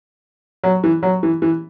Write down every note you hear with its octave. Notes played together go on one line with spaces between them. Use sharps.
F#3
E3
F#3
E3
E3